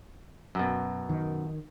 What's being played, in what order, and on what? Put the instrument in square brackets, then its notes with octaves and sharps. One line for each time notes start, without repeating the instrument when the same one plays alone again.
[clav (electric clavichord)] F#2 B2
[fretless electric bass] D#3